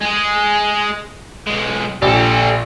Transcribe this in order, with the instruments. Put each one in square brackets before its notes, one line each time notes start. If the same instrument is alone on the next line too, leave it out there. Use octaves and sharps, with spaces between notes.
[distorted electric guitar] G#3 G#4
B1 G#3
[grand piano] A#1 [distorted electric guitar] G4 A4